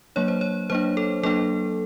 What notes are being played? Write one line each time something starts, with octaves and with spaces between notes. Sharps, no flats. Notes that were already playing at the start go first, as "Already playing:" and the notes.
F#3 A#3 D4 C#5
C5
C#5
F#3 A#3 D4 C5
A4
F#3 A#3 D4 A4